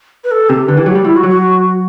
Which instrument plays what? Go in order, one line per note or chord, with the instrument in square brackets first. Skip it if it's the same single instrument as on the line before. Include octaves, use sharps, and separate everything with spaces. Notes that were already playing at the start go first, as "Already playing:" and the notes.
[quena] B4
A4
[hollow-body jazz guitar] C3 [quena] G4
[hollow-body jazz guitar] D3 [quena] B4
[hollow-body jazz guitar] E3 [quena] G4
[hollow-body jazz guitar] F#3
[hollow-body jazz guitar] G3 [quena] G4
[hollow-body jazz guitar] G3 [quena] E4
[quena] F#4
[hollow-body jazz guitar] F#3
[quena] F#4